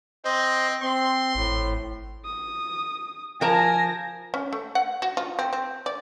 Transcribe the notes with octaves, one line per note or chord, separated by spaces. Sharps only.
C4 C5 D#5
C4 C6
G#1 A2
D#6
F3 A#4 G#5 A5 A#6
C#4
A3
F#5
F#4
F4
C4
C4
D5